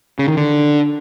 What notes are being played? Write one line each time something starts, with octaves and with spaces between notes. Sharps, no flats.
C#3
D#3
D3